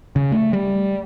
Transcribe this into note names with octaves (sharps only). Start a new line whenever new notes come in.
C#3
A3
G3